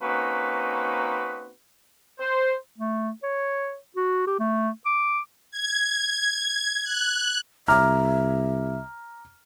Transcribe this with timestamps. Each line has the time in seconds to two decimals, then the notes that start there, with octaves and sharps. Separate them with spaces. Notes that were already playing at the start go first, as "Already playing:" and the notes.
0.02 A#3 C4 C#4 D#4 F#4 B4
2.20 C5
2.78 A3
3.23 C#5
3.97 F#4
4.27 G4
4.39 A3
4.86 D6
5.51 G#6
6.83 F#6
7.68 C2 E5 A#5 D6 F6